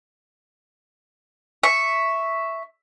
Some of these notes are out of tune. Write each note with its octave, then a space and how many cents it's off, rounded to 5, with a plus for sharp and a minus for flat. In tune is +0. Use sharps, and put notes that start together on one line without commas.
E5 +0 C#6 +0